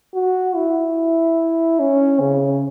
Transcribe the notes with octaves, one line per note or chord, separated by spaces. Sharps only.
F#4
E4
C#4
C#3